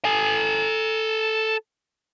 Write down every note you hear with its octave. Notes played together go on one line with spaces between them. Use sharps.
A4 G#5